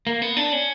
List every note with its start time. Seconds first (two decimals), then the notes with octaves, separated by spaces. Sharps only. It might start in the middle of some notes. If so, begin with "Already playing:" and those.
0.07 A#3
0.22 B3
0.37 D4
0.53 C#4